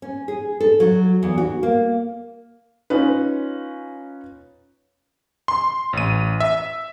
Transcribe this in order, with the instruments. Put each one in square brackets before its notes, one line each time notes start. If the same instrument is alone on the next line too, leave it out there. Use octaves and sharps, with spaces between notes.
[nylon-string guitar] C#4
G#4
A4
F#3
E2
F#4
A#3
[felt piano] C#4 D#4 F4 B4
[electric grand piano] C6
A1 D#7
E5